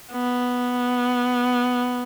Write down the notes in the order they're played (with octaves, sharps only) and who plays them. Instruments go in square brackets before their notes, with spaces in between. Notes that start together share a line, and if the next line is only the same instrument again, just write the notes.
[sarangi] B3